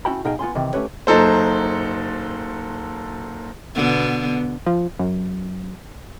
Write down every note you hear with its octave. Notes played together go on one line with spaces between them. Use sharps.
C#4 E4 F#4 G5 A5 B5
B2 D#4 G#4 F5 G5
B3 F4 G#5 C6
C3 D#3 E3
A3 C4 C#4 G4 B4 C#5
F#1 F#3 D#4 A4 C5
B2 D3 B3
F3
F#2